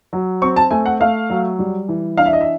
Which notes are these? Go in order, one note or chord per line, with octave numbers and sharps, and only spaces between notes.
F#3
C4 C#6
A5
A3 G#5
F#5
A3 F5
F#3
G3
E3
D4 F5
E5
D#5
E5